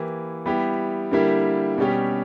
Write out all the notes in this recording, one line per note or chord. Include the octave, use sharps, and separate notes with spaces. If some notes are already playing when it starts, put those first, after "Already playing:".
Already playing: E3 A#3 E4 G4
G3 B3 E4 G4
D3 G3 A#3 E4 G4
B2 G3 C#4 G4